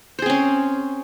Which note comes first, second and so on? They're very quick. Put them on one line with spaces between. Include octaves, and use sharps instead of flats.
C5 G#4 C4 C#4